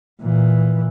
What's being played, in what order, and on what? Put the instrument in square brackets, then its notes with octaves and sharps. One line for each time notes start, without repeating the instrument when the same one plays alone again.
[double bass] A#2 E3